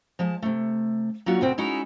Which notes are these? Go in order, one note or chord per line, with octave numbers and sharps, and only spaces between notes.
F3 G#3 A5
C3 A3
F#3 A#3 C#4 D4 F4 F#4
D2 B2 C4 G5
G#3 C#4 D#4 E4 F#4 A#5